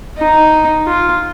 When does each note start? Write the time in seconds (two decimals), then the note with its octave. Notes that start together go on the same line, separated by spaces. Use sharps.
0.18 D#4
0.86 F4